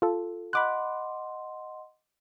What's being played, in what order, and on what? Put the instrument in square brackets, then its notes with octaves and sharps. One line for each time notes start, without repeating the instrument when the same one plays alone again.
[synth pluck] F4 A4
[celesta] D#5 F#5 C6 [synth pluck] B5 D6 F#6